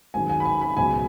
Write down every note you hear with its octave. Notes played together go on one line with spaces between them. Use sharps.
G#1 F#2 D#3 G#3 G#5
G#5
B5
G#5
B5
C#2 B2 F#3 G#5